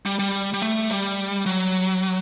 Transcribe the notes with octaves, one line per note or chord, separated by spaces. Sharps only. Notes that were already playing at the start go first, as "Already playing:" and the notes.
G3
G3
G3
A3
G3
F#3